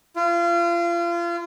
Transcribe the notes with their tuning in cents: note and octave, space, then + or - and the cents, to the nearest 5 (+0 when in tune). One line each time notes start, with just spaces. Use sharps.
F4 -30